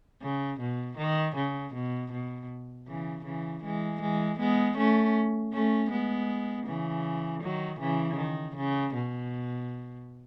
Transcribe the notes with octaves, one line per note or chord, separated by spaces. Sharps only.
C#3
B2
D#3
C#3
B2
B2
C#3 E3
C#3 E3
E3 G#3
E3 G#3
G#3 B3
A3 C#4
A3 C#4
G#3 B3
C#3 E3
D#3 F#3
C#3 E3
D#3
C#3
B2